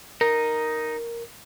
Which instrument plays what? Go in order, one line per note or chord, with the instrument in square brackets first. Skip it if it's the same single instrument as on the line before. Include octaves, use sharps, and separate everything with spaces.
[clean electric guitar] D#4 [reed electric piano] A#4